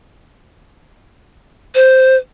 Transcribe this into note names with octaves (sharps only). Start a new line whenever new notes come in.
C5